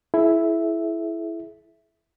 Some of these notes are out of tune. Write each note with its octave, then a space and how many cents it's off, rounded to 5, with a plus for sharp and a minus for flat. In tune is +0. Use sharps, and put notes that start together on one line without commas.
E4 +10 G#4 +45 E5 +0